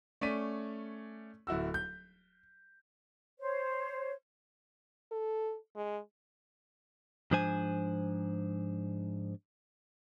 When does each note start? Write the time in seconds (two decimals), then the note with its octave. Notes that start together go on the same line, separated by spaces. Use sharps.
0.21 A3 C#4 D5 B6 D#7
1.47 D1 E4 F#4 E6
1.74 G6
3.40 C5 C#5
5.11 A4
5.76 G#3
7.31 G#2 F3 D4 C5 G#5